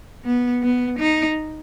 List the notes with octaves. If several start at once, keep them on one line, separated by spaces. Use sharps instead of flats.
B3
B3
D#4